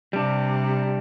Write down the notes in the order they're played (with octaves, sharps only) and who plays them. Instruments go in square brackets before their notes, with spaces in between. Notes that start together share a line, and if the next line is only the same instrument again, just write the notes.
[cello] C3 [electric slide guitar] G3 D4